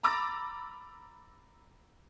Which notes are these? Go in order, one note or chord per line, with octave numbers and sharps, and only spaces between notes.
A#5 B5 D6 E6 A6 A#6